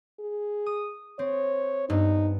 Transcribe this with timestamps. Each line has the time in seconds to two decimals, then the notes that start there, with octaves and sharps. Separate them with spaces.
0.20 G#4
0.66 D#6
1.19 C4 C#5
1.90 G2 B3 D#4